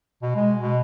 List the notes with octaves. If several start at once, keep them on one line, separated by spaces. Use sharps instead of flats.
B2
G#3
B2